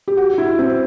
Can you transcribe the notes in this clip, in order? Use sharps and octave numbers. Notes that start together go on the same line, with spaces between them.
G4
F#4
E4
C4